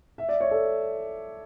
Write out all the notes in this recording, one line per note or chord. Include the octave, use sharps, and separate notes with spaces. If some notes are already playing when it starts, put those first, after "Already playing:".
E5
D5
C#5
A4